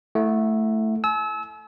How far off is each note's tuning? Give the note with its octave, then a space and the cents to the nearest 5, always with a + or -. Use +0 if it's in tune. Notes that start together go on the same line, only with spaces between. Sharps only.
A3 +0 E4 +0 F#5 -20
G#5 +45 E6 -30